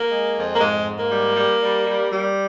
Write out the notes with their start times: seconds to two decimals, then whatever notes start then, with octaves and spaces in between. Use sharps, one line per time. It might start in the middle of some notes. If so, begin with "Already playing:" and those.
Already playing: A#3
0.10 G#3
0.35 F2
0.54 A#3
0.60 G#2 G#3
0.85 G#2
0.98 A#3
1.11 G3
1.36 G3
1.61 G3
1.87 G3
2.12 G3